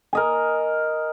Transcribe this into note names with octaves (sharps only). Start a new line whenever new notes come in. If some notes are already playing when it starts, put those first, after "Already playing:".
A#4 D#5 G#5